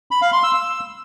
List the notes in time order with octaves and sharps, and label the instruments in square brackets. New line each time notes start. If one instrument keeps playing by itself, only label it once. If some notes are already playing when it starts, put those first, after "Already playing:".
[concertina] B5
F5
C6
E6
E6